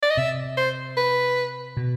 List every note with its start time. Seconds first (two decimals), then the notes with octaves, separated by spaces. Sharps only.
0.03 D5
0.10 D#5
0.17 C3 E5
0.57 C5
0.97 B4
1.77 B2